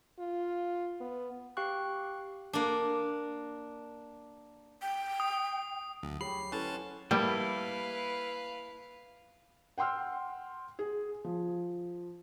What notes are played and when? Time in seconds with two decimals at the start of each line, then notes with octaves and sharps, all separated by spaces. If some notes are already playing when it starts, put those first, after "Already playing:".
0.19 F4
1.01 B3
1.57 G4 F5 G5 C#6 F#6
2.53 A#3 D4
4.81 G5
5.20 D#6
6.03 D2 F#3
6.21 G4 G#4 C#5 B5 C7
6.52 C#4 E4 A4 B4 C5 F#5 A5
7.11 G3 A#3 E4 A4 B4 F5
9.78 F#5 G5 C6 E6 F6
10.79 G#4
11.25 F3